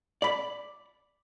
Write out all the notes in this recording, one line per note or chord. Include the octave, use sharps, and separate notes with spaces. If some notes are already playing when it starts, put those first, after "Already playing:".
D5 B5